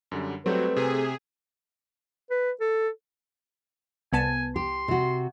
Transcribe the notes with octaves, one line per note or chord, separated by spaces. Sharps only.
F#2 D3 G3
F#3 G3 A3 C4 B4
C3 G#4
B4
A4
C2 B3 G#5 A5
G4 C6
C3 F#4